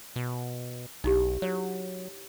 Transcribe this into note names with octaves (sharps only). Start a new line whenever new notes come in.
B2
B1 D#4 E4 G4
F#3 C#5